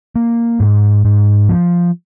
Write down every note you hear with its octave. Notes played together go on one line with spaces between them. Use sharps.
A#3
G#2
G#2
F3